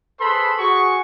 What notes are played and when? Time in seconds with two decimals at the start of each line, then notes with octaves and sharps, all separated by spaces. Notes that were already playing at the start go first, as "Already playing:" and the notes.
0.20 G#4 A4 B4 C5 B5 C6
0.59 F#4 G#4 C#6